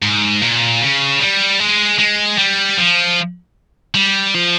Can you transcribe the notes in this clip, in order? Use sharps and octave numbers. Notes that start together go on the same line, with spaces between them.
G#2
A#2
C#3
G3
G#3
G#3
G3
F3
G3
F3